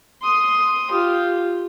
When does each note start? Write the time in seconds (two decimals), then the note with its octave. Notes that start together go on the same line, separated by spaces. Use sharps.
0.22 C6 D#6
0.91 F4 G4